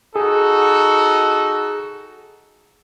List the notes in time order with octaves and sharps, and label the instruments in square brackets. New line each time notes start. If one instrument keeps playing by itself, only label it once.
[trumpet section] D#4 F#4 A4 [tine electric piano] G#4